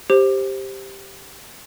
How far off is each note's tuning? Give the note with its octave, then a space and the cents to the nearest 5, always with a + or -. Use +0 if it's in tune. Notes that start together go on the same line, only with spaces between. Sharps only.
G4 +0 C5 +10